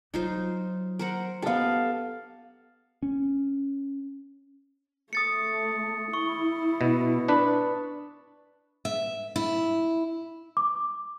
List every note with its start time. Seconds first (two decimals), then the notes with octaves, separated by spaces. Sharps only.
0.14 F#3 D#4 F4 C5
0.99 A#4 C5 F#5
1.42 B3 G4 A4 F5
3.03 C#4
5.13 A3 D#6 A6 C#7
6.13 E4 C#6
6.81 B2
7.28 D4 B4
8.85 E5
9.36 E4
10.57 D6